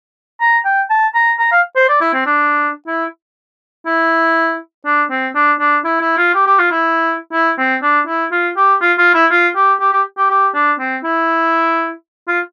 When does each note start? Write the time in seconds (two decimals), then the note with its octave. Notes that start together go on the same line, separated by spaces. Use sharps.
0.41 A#5
0.65 G5
0.90 A5
1.15 A#5
1.39 A#5
1.52 F5
1.76 C5
1.89 D5
2.01 E4
2.14 C4
2.26 D4
2.87 E4
3.87 E4
4.86 D4
5.10 C4
5.35 D4
5.60 D4
5.85 E4
6.01 E4
6.18 F4
6.34 G4
6.46 G4
6.59 F4
6.71 E4
7.33 E4
7.58 C4
7.82 D4
8.07 E4
8.32 F4
8.57 G4
8.81 F4
8.98 F4
9.14 E4
9.31 F4
9.56 G4
9.80 G4
9.93 G4
10.18 G4
10.30 G4
10.55 D4
10.79 C4
11.04 E4
12.28 F4